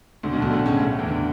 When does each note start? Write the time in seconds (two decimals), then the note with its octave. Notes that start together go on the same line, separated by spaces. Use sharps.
0.23 D2 D3
0.33 B1 B2
0.42 D2 D3
0.51 A2 A3
0.66 C#3 C#4
0.80 A2 A3
0.99 E2 E3
1.08 D3